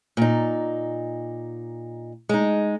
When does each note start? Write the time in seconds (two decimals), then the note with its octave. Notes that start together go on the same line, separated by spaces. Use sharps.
0.17 A#2 D#4
2.29 G#3 D#4